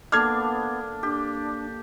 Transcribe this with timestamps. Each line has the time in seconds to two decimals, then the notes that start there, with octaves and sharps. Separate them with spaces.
0.12 A#3 B3 D4 A4 D6 F6 G#6
1.03 D4 G4